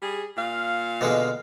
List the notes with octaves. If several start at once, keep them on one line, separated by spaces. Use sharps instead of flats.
G3 G#4
A#2 F5
B2 D3 G#3